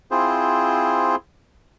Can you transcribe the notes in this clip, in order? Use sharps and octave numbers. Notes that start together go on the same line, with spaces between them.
C4 E4 F4 G#4 C5